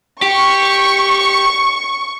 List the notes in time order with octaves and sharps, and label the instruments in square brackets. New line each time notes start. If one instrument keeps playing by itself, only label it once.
[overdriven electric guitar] G4 [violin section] C#6